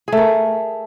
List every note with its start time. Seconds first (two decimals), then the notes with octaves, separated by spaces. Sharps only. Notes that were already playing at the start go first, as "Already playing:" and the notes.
0.08 G#4
0.12 A3
0.17 A#4